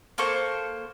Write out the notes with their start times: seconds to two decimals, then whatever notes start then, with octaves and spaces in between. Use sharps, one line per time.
0.18 A#3 A4 C5 C#6